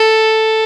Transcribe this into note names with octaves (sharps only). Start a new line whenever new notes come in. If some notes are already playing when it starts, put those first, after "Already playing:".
Already playing: A4